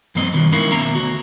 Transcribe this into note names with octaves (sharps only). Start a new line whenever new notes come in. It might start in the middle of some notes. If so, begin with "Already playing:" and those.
G2 F3 A#3 C4 D#5
G2 B2 D3 D#3 F3
G#3 C#4 D#4 E4 A#4 F5
D#2 B2 D#3 A#3 E5 A#5
D2 F#4